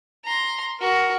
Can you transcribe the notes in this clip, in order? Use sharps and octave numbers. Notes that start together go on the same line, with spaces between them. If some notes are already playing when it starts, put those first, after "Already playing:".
A#5 C6
F#4 A#4